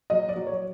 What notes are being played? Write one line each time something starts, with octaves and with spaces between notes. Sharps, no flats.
F#3 D#5
D5
F#3
C#5